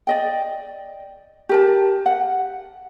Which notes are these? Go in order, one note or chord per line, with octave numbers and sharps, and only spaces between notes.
D5 D#5 G5
G4 A#4 A5
F#5